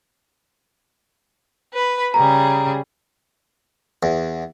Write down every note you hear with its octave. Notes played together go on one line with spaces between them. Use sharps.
B4 B5
C#3 G3 G#4 A#5
E2